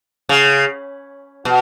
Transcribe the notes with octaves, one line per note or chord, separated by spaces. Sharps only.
C#3
B2